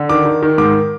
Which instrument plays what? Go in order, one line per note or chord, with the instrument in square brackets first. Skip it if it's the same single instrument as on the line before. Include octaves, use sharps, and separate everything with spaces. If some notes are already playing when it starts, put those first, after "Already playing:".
Already playing: [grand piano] D3
D#3 D6
D#3
D#3
G#2 D6